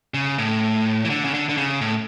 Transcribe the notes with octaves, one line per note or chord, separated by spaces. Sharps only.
C#3
A2
E3
D3
C#3
D3
D3
C#3
A2